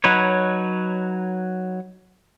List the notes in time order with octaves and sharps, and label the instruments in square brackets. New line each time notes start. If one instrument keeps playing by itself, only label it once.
[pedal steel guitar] F#3 D#4 B4 C#5